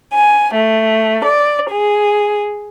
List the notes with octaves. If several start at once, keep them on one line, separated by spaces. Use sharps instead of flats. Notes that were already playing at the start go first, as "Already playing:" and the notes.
G#5
A3
D5
G#4